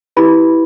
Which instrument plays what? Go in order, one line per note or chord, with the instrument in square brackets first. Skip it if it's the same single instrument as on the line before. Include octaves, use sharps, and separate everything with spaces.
[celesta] E4 G4 B4 B5